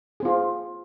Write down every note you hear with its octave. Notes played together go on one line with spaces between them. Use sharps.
C4 F4 G#4 C5